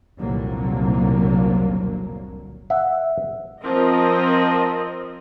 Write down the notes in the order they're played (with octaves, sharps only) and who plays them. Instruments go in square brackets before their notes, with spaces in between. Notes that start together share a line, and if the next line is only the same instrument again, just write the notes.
[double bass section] F1 C2 A#2 D3 F#3 A#3
[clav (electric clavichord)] E5 F#5
[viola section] F3 C4 A#4 D#5